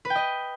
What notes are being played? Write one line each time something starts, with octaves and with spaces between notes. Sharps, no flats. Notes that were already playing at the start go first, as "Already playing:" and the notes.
B4
G5
D#5